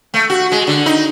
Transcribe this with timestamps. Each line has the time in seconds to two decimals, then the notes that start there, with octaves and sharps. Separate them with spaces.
0.14 A3
0.30 F#4
0.52 G#3
0.67 D3
0.86 D#4